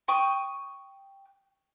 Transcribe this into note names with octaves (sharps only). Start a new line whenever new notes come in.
G5 C#6 D#6